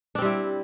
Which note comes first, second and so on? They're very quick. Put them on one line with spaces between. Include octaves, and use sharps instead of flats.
D4 C4 G3 E4